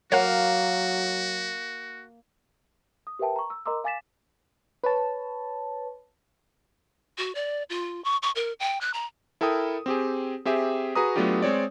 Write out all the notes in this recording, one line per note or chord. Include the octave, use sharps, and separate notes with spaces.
F#3 A#3 F#4 C#5 F#5
D#6
G4 A#4 B4 E5 G5 A5
A#5 C#6
E6
A#4 D#5 A#5 C6 D6 E6
F5 G#5 D6 A6 B6 E7
B4 C#5 A5
F#4
D5
F4
C#6
C#6
A#4
G5
F#6
A#5
E4 A4 A#4 G5 D#6
C4 G4 G#4
C4 G4 G#4 E5
F#4 G#4 B4 A#5 D#6
F#3 A3 B3 D4 F4 G4
G#3 C4 C#5 D5